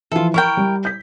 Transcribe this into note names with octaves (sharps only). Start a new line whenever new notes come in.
E3 F3 F4 A4
E4 A#4 G5 C#6
G3
G6 B6